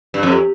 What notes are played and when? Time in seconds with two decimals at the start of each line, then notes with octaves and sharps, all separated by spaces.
0.14 G2
0.23 F2